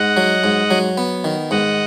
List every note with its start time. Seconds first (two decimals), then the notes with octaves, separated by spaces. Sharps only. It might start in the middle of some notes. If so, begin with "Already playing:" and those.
Already playing: G#2 D#5 F#5
0.17 F#3
0.44 G#2
0.71 F#3
0.98 B3
1.24 D#3
1.51 G#2 D#5 F#5